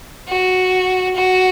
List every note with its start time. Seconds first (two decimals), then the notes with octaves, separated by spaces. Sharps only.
0.29 F#4
1.16 F#4